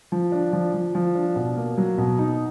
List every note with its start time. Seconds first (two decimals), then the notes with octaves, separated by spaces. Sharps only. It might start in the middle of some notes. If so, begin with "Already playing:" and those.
0.12 F3
0.32 D4
0.53 F3
0.74 F3
0.95 F3
1.15 D4
1.36 B2
1.56 A#3
1.77 F#3
1.98 B2
2.19 D#4